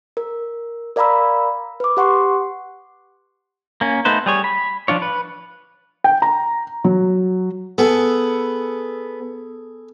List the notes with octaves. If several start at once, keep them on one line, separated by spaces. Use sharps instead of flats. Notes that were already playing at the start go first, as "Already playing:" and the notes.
A#4
A#4 D5 F5 A#5 B5 E6
B4 D6
G4 F#5 C6 C#6
A#3 C#4
A3 B3 D#4 B4 C5
G3 G#4 C#5
B5
F3 D4 F4 C#5
B4
G5
A#5
F#3
B3 G#4 A4